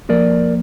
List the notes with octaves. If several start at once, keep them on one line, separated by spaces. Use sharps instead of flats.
F2 F3 A#3 A#4 D5